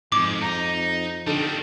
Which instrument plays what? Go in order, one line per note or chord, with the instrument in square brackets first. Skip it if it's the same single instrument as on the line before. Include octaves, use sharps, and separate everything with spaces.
[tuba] F2 [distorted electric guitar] G#2 [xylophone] D6
[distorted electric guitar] D#4 [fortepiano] A#5
[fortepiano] D3 D#4 A4 [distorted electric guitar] D#3 G3